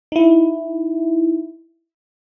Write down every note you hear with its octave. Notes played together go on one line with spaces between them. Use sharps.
D#4 E4